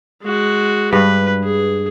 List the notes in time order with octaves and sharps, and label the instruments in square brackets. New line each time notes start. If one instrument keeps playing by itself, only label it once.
[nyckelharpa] G#3 F#4
[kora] G2 [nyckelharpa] B4
[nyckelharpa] G#4